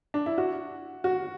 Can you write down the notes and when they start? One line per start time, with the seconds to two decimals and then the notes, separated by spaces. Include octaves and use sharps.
0.14 D4
0.26 E4
0.38 F#4
1.04 F#4